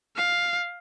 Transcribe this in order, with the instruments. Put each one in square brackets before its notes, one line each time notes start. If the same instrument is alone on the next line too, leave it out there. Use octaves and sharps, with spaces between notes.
[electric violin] F5